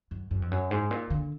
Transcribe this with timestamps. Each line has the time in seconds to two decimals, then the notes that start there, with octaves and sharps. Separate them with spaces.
0.11 F#2
0.31 F#2
0.42 F2
0.51 F#2
0.71 G#2
0.91 A#2
1.10 D3